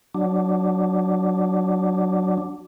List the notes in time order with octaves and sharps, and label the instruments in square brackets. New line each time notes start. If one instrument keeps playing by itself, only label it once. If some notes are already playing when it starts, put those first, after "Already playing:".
[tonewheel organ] F#3 D4